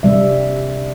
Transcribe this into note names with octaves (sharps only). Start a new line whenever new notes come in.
C3 G3 E5